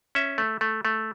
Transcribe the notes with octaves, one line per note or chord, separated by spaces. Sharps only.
C#4 E5
A3
A3
A3